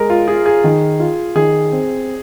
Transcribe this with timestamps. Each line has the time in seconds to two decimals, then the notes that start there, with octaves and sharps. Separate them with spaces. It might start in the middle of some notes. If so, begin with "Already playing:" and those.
Already playing: G#3 A#4
0.10 F4
0.28 F4 G#4
0.46 G#4
0.64 D#3
1.00 F4
1.35 D#3 G#4
1.72 C4